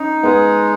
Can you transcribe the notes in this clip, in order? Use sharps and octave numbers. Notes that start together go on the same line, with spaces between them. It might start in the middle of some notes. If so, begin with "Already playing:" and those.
Already playing: C#4 D#4
G#3 B3